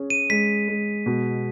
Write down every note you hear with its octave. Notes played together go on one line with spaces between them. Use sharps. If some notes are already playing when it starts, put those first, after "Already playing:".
Already playing: C#4 G#4
D#7
G#3 B6
G#3
B2